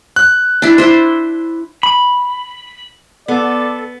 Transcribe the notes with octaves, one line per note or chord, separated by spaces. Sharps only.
F#6
D4 E4
E4 C5
B5
B3 A4 D5